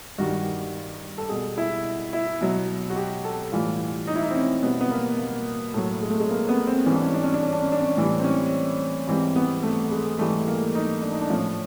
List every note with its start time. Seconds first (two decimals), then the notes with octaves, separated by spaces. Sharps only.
0.18 G2 D#3 G3 F#4
1.18 A4
1.29 B2 G3 G#4
1.58 E4
2.13 E4
2.41 B2 F#3
2.90 F#4
2.96 G4
3.25 A4
3.52 A2 E3 G3 F4
4.07 D#4
4.16 E4
4.22 D#4
4.30 C4
4.35 C#4
4.63 B2 G3 B3
4.81 B3
4.91 A#3
5.18 A#3
5.74 A2 F#3 A3
6.02 G#3
6.10 A3
6.20 G#3
6.30 A#3
6.49 B3
6.67 C4
6.86 G#2 E3 G3 C#4
6.95 D4
7.04 C#4
7.14 D4
7.24 C#4
7.34 D4
7.42 C#4
7.52 D4
7.62 C#4
7.72 D4
7.81 C#4
7.97 A2 E3 G3 D4
8.19 C4
8.24 C#4
9.07 G#2 E3 G3 C4
9.36 B3
9.63 A3
9.91 G#3
10.19 G#2 E3 G3 A3
10.47 A#3
10.75 D#4
11.02 D4
11.12 D#4
11.21 D4
11.30 A2 F3 C#4